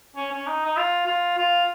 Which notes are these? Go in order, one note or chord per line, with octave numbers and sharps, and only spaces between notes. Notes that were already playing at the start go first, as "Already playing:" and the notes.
C#4
C#4
D#4
D#4
F4
F4
F4